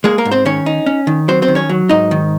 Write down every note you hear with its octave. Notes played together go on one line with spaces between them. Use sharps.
G#3 A#3 G#4
A#3 A#4
G#2
C4 C5
D#3 C#4 C#5
D#4
C#4
D#3
F#3 C4 C5
C4 C5
D#3
C#4 C#5
F#3
G#2 D#4 D#5
D#3